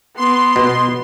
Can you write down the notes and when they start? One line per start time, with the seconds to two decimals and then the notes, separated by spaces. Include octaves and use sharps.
0.17 B3 C6
0.56 B2